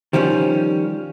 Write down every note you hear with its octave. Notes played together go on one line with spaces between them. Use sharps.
D#3 F3 G3 C#4